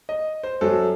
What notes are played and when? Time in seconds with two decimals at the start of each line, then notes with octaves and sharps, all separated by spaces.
0.09 D#5
0.43 C5
0.61 F#2 F#3 A4